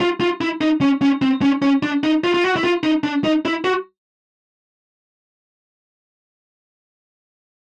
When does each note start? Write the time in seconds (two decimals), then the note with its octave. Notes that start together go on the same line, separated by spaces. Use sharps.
0.01 F4
0.21 F4
0.41 E4
0.61 D#4
0.81 C#4
1.02 C#4
1.22 C4
1.42 C#4
1.62 C#4
1.83 D4
2.04 D#4
2.24 F4
2.34 F4
2.44 F#4
2.56 E4
2.64 F4
2.83 D#4
3.04 D4
3.24 D#4
3.45 E4
3.64 F#4